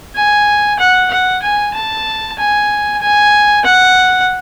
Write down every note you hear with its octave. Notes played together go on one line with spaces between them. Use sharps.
G#5
F#5
F#5
G#5
A5
G#5
G#5
F#5